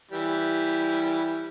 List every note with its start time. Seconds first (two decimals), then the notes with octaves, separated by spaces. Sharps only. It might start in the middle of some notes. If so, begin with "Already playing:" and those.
0.11 E3 G3